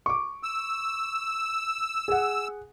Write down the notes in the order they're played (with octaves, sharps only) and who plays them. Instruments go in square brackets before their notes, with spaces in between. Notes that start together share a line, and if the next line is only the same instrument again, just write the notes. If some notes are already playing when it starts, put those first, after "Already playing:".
[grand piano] C#6 D6
[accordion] E6
[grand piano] G#4 F#5